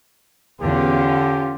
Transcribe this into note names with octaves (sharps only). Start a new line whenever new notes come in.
E2 D3 C#4 F4 G4